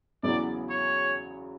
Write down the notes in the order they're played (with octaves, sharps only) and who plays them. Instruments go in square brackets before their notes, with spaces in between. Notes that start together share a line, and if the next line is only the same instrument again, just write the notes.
[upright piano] E2 C#3 F#3 B3 E4 [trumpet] D5
[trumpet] C#5